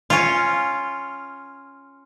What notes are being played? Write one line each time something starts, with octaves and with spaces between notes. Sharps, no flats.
C#4 F4